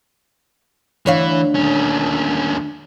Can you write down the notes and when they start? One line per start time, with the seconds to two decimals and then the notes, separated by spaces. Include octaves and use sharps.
1.06 D2 E3 C#5 F5
1.55 D#2 C#4